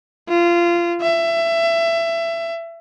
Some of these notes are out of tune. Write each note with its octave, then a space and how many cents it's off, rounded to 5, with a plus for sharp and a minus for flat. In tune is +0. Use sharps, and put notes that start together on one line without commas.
F4 -20
E5 +20